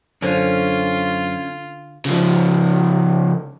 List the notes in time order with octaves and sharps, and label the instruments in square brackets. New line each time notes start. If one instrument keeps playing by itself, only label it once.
[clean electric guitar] F#2 C5 [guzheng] D3 [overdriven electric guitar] C#4 [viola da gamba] F4
[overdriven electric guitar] C#3 F3